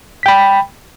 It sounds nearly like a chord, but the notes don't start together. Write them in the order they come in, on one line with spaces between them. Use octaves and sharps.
B6 G5 B5